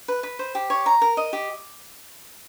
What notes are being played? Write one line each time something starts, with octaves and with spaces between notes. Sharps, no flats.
B4
B4
C5
G4
C#5
A#5
A#4
D#5
G4